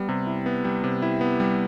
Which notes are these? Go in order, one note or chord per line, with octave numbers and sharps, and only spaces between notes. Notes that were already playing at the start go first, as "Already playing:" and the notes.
Already playing: G3 B3
C3
E4
B3
G3
C3
E4
B3
G3